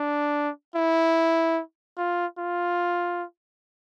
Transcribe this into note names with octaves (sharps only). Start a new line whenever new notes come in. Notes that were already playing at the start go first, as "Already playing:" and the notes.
Already playing: D4
E4
F4
F4